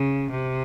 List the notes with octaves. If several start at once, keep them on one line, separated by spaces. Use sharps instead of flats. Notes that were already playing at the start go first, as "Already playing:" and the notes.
Already playing: C#3
C3